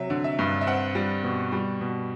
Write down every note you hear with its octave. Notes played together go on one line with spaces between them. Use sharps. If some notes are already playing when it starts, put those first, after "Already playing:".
Already playing: C3 F#3 E5
D3
E5
G2
E5
C4 F#5
G3
B2
G3
B2